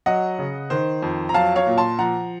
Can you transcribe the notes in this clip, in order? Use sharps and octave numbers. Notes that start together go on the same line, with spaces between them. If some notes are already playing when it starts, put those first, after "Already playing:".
F#3 D#5 F#5
C#3
D#3 C5
F2
A#5
F#3 F5 A5
C#5 F5
A#2
A5 C6
F3 F#5 A#5